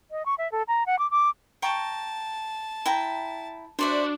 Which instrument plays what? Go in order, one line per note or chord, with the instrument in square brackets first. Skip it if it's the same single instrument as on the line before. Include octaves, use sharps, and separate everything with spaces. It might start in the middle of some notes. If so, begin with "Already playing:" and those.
[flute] D#5
C#6
E5
A4
A#5
F#5
D6
D6
[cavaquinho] G5 A#5 C#6 [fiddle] A5
[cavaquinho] E4 G5 A#5
[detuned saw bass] D4 [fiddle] F#4 [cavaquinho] C5 D5 E5